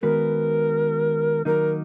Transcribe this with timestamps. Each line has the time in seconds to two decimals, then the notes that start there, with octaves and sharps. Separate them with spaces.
0.02 D#3 G#3 B3 F#4 A#4 B4
1.45 D#3 F#3 A#3 D#4 A#4